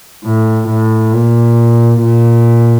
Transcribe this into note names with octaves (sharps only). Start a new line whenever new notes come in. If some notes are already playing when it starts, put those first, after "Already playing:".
A2
A2
A#2
A#2